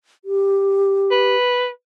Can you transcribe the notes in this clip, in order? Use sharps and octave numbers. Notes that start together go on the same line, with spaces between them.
G4
B4